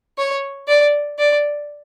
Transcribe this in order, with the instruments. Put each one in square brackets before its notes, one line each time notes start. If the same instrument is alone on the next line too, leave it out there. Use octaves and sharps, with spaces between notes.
[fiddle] C#5
D5
D5